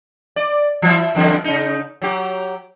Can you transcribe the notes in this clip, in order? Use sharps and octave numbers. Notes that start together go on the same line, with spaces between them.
D5
E3 E4
E2 G2 D3
C#3 D#4
F#3 G4